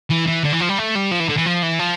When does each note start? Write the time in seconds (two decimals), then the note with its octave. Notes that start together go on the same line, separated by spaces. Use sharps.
0.10 E3
0.27 E3
0.44 D3
0.52 E3
0.60 F3
0.69 G3
0.78 A3
0.95 G3
1.11 F3
1.20 E3
1.29 D3
1.37 E3
1.46 F3
1.62 E3
1.79 F3